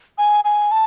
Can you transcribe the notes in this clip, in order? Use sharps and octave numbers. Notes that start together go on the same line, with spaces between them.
G#5
G#5
A5